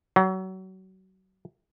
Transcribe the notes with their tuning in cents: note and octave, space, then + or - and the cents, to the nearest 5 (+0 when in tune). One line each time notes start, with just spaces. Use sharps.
F#3 +30